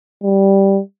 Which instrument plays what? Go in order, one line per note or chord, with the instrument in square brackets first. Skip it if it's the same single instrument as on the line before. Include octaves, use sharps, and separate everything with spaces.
[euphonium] G3